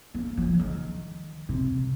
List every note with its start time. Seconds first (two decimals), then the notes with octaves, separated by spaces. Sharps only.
0.14 A#3
0.37 F3
0.59 D#3
1.49 C3